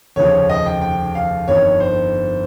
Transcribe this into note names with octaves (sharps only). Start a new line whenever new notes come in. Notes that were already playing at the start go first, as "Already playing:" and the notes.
F1 D#2 C#3 F3 C#5
D#5
G5
G5
F5
G1 F2 D#3 C#5
C5